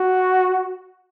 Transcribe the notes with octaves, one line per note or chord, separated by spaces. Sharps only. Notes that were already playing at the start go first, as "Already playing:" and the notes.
Already playing: F#4